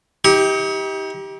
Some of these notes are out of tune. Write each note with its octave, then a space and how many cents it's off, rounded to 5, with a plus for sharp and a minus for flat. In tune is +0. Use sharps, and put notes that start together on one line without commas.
D#4 +40 G4 +0